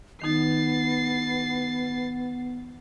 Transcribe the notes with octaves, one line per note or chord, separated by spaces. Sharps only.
D#3 B3 D#4 A6 C7